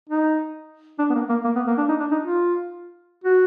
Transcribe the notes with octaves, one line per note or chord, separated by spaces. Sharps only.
D#4
D4
B3
A#3
A#3
A#3
B3
A#3
D4
D#4
D4
D#4
F4
F#4